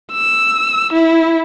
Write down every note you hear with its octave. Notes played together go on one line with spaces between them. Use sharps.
E6
E4